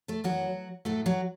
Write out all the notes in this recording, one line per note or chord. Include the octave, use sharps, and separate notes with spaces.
A3 A4
F#2 E3 F#3 F#4
A2 F#3 A3 A4
F#3 F#4